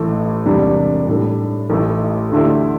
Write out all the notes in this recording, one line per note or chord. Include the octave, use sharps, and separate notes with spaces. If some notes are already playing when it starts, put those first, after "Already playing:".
Already playing: A1 A2 A3
E1 E2 C3 G3 D4
A2 G3 D4 A4
A1 A2 E3 A3 E4
D2 D3 A3 E4 G4